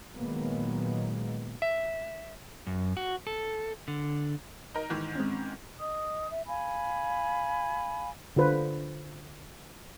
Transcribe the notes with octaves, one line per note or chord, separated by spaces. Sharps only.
A#2 D#3 F#3 G#3 A#3 B3
E5
F#2
F#4
A4
D3
D#4 A#4
G#2 D#3 E3
G#3 C4 C#4
D#5 D#6
E5
F5 G#5 B5
D3 F4 B4 C5